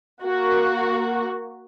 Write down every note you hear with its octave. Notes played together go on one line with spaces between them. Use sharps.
A#3 F#4